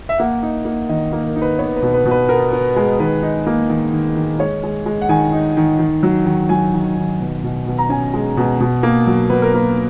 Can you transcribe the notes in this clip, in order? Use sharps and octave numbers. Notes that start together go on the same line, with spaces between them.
E5
A#3 F#5
D#4
A#3
D#3 D#5
A#3
A#4
D#4
B4
B3 C#5
B4
B2
B4
B2
B4
B3 A#4
B3
G#3
D#3 B4
D#4
A#3
D#3
D#3
D#3
G#3 C#5
G#3
G#3
F#5
D#3 G#5
D#4
D#3
D#3
F#3
D#3
F#3 G#5
D#3
D#3
B2
B2
B2
A#5
C#4 G#5
G#3
B2
B2
A#3
F#3
B2 B4
A#4
A#3 B4